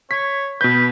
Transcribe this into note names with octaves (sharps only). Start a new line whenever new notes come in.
C#5 B6
B2 B4 G6